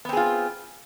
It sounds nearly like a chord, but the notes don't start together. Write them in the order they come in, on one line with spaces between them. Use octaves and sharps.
B3 C4 G#4 F4